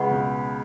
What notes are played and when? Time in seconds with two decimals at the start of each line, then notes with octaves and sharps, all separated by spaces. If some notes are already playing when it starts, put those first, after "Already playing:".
Already playing: C#2 C#3 B4 D#5 F#5 C#6
0.11 B2